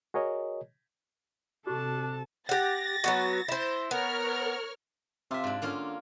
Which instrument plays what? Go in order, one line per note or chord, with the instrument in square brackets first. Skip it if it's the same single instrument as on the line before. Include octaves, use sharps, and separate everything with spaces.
[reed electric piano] F#4 G#4 A#4 C#5 D#5
[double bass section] C3 [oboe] D4 [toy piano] F#4 G4 C#6 [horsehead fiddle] A4 A5
[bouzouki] G4 F#5 [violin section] A6 A#6
[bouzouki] F#3 B3 F#4
E4 C5
[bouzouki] B3 [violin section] A#4 C#5 F6
[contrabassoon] C3 [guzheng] F4 E5
[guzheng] G#2 D4
[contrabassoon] D3 [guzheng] A#3 C#4 F4